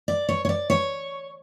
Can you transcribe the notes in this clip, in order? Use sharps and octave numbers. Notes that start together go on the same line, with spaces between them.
D5
C#5
C#5
D5
C#5